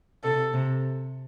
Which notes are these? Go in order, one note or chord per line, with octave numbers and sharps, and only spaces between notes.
C3 A4
C3